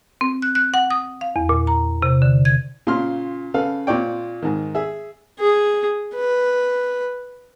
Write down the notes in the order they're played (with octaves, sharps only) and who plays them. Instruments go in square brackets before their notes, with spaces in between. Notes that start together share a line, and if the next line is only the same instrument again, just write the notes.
[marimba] C4
F#6
F#6
F#5
D#6
F5
E2
A#2
A#5
C3
D3
G#6
[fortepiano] A#2 C#3 C6 F6
C#3 A4 B4 F5
A#2 C4 C#5 D5 G5
G#2 D#3
G#4 E5
[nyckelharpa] G#4
B4